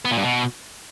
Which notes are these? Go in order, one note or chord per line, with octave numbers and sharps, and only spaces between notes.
B3
A#2
G2
B2